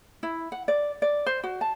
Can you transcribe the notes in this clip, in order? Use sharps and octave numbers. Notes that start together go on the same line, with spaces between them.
E4
F#5
D5
D5
C5
F#4
A5